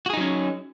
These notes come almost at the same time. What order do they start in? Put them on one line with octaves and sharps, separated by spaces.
F#4 G#4 D#4 F#3 C#4